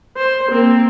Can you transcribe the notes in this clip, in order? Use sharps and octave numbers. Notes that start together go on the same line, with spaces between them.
C5
A#3 C4